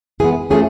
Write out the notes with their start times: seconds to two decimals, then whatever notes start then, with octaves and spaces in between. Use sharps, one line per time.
0.20 E3 G#3 B3 G#4
0.50 F3 A3 C#4 G#4